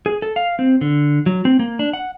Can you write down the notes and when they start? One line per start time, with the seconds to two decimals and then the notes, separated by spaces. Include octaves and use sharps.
0.06 G#4
0.22 A4
0.36 F5
0.59 C4
0.81 D3
1.26 F#3
1.45 C4
1.59 A#3
1.79 D4
1.93 F#5